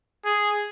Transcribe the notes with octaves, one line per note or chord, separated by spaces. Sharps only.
G#4